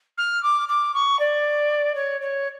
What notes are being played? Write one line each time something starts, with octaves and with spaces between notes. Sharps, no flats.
F6
D6
D6
C#6
D5
C#5
C#5